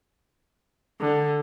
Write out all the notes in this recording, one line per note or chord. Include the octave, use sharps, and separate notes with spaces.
D3